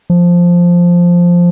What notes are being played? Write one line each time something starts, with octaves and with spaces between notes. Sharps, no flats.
F3